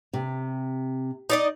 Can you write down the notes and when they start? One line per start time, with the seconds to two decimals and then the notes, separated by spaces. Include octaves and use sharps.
0.13 C3
1.30 D#4 D5 D#5